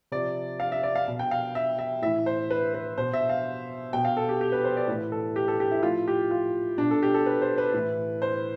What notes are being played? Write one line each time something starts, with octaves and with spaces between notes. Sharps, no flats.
C3 F3 D5
F5
E5
D5
F5
B2
G5
F5
E5
E5
A2 E3 E5
C5
B4
B4
B2 C5
E5
F5
B2 G5
F5
A4
G4
G4
B4
C5
D5
A2 E3 B4
A4
G4
A4
G4
E4
A2 F3 F4
G4
F4
B2 D4
A4
G4
A4
B4
C5
B4
A2 E3
C5